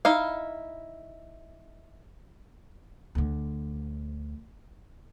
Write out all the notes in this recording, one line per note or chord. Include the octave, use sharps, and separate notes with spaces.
D#4 E4 F5
D2 D3